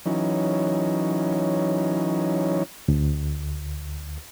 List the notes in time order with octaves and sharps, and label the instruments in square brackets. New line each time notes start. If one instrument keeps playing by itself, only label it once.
[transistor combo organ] E3 F#3 C#4 D#4
[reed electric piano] D2